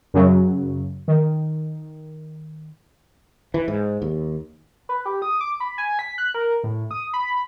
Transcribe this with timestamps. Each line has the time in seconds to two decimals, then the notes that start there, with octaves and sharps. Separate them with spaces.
0.14 F#2 C#3 F#3
1.08 D#3
3.54 E3
3.68 G#2
4.02 D#2
4.89 B4
5.06 G4
5.22 D#6
5.40 D6
5.60 B5
5.78 G#5
5.99 B6
6.18 F#6
6.34 A#4
6.64 A2
6.91 D#6
7.13 B5